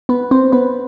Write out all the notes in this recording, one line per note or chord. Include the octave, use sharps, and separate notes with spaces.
B3 B4
C4 C5
B3 B4